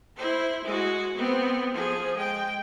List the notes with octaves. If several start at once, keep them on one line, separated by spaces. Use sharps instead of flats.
E4 C5
G#3 F#4
B3 C4
F3 G#4
G#3 G5